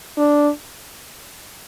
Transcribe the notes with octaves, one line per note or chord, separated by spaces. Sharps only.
D4